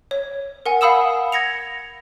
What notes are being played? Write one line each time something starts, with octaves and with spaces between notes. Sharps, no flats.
C#5
A#4 F#5 G#5
F5 F#5 B5 D#6 E6 E7
G#6 A#6 C#7 F7